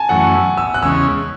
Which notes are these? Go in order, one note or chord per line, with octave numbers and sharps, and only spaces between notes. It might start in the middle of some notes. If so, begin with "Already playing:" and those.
Already playing: G#5 A5
F#2 E3 A3 C#4 F#5
E6
F#6
E2 C#3 G#3 C#4 E6